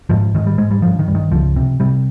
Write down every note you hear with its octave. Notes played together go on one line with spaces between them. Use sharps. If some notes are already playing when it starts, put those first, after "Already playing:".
G#2 F3
G#2 D#3
G3
G#2 G#3
G3
G2 F3
D#3
G2
D#3
C#2 F3
C3
C3 G3